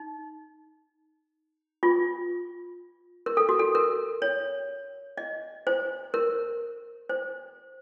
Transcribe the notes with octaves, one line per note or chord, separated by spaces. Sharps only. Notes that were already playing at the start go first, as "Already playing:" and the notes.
Already playing: D#4
F4
A#4
A4
F#4
A4
A#4
C#5
D#5
C5
A#4
C5